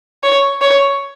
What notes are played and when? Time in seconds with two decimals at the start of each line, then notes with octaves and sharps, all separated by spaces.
0.23 C#5
0.61 C#5